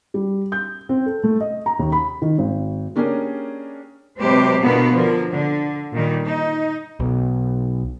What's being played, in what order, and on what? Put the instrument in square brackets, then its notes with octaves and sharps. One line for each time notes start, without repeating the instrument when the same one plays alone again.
[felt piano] G3
G6
C4
A4
A3
D#5
A#5
D#2
B5
D#3
G#1
A#3 C#4 D4 G4 G#4 A#4
[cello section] C3 F#3 G#3 G4 B4 C5
B2 D3 A#3 B3 F4
D3 F3 A#4
D3
A#2 D#3 G3
D#4
[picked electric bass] B1